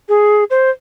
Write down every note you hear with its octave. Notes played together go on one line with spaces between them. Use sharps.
G#4
C5